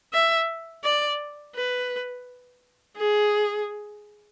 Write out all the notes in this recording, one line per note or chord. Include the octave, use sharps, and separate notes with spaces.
E5
D5
B4
G#4